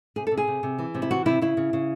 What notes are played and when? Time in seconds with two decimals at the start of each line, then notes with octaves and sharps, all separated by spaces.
0.16 C3 G#4
0.27 C3 A4
0.37 G#4
0.48 C3
0.63 C3
0.79 E3
0.95 C3
1.02 E4
1.11 E3 F#4
1.26 C3 E4
1.42 C#3 E4
1.57 C#3
1.73 C#3